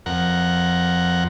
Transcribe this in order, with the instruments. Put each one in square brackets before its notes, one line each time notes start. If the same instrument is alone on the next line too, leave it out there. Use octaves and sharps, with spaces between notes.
[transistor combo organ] F2 A#4 F#5